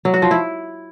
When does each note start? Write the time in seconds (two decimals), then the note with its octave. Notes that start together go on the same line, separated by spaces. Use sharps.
0.05 F#3
0.14 F#4
0.22 F3
0.31 E4